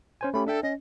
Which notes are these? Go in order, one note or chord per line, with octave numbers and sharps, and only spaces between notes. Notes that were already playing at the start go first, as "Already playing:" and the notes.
C#4 C5 G#5
A3 C#4 G4 B5
D4 A4 E5 G5
C#4 D#5